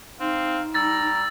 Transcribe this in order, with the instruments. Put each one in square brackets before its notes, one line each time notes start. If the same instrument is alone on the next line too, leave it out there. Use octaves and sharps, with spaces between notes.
[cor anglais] C4 [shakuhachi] D#4 [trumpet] F5
[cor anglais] G3 [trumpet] A#5 [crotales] E6 A6 A#6